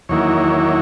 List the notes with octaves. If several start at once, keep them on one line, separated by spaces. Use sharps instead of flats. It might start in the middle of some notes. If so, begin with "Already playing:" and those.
E2 D#3 F#3 A#3 E4 C#5